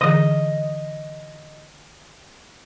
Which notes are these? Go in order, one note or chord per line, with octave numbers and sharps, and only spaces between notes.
D3 E3 G#4 D#5 D#6